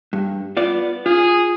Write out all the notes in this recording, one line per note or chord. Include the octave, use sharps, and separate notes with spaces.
G2
B3 F4 D5
F4 G#4